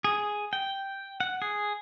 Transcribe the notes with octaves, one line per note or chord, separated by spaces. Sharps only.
G#4
G5
F#5
G#4